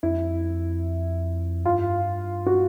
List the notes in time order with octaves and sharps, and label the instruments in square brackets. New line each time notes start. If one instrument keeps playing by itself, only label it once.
[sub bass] F2 [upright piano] E4
[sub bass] G2 [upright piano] F4
[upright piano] F#4